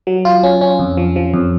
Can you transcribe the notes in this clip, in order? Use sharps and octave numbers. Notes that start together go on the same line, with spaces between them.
F#3
F4
C#4
C#4
F2
F3
F3
F2